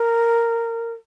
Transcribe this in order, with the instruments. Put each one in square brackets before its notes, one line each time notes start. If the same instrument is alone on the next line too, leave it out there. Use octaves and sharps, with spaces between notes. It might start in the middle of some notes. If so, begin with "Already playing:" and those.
Already playing: [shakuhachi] A#4